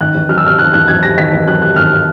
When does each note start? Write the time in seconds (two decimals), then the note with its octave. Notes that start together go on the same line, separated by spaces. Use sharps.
0.01 D#3 F#6
0.15 E2
0.29 F#3 F6
0.38 E6
0.44 C3 F6
0.58 D#3 F#6
0.73 E2 F#6
0.88 F#3 G#6
1.03 C3 A#6
1.17 D#3 B6
1.33 E2
1.47 F#3 F#6
1.62 C3 F#6
1.76 D#3 F6